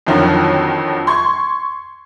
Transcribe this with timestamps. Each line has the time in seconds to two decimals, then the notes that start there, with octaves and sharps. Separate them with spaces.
0.07 F2 D3 D#3 F3 F#3
1.07 C6 C#6 G#6